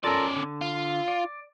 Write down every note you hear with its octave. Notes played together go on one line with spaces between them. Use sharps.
C#4 F4 A4 A#4 D5
D3
F4
D5